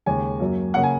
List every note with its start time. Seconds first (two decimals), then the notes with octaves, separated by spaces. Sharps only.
0.06 D#2 C#3 G#3 G#5
0.40 F#2 F#3 A#3
0.74 C#3 A#3 F#5
0.83 G#5